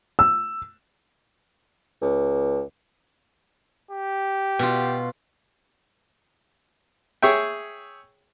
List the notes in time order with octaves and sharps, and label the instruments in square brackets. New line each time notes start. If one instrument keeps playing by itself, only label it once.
[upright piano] E6
[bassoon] C#2
[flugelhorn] G4
[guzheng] B2 F4
[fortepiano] G#4 C#5 E5 G5